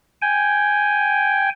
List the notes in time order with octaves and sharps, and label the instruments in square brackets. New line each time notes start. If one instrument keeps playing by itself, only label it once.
[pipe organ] G5 G#5